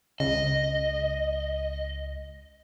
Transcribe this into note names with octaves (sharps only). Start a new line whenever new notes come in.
C#2 D#5